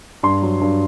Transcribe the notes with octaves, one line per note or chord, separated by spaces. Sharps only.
G2 C6
F#3
G2